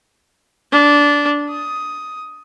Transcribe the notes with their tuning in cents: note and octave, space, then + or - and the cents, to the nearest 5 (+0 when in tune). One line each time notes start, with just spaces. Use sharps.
D4 -15
D#6 +10